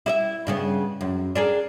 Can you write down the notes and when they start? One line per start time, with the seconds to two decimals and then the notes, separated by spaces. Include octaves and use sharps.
0.06 E4 D#5 E5
0.47 G2 C#3 B3
1.01 F#2
1.35 D4 G#4 A#4